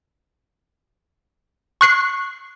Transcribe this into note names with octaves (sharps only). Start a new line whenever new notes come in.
C#6 F#6 C7